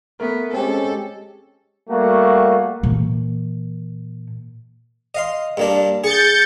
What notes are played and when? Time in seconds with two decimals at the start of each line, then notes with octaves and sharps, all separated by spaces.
0.20 A3 B3 A#4
0.54 G#3 C4 C#4 G4 A4
1.90 G3 A3 A#3 F#4
2.83 A#2 E3
5.15 D#5 F5 C6
5.57 G2 A#3 D4
6.04 G#4 G6 A6 C#7